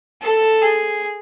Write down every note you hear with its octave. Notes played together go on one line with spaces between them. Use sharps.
A4
G#4